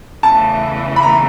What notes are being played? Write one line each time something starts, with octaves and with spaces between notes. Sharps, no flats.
E2 C#3 E3 A3 A5
B5
A#5